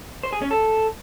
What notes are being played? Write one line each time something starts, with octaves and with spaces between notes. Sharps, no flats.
C5
G#4
C#4
A4